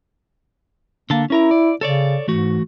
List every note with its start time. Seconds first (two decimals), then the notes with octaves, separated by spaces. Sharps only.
1.10 D3 A#3 A5
1.30 C#4 E4 A#4 A#5
1.51 D5
1.81 C#3 A4 C#5 D5
2.28 G#2 E3 A3 F#4